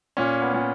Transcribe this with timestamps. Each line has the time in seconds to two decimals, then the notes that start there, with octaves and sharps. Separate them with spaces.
0.17 A#2 C#4
0.42 B3
0.54 A#2